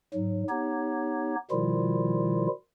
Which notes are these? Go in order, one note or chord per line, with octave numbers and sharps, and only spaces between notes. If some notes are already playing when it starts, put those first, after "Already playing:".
G#2 F#3
B3 D#4 G4 C#5
B2 D#3 F3 G3 E4 F4